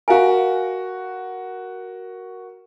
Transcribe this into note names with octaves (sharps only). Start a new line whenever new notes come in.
F#4 A#4 F5 G#5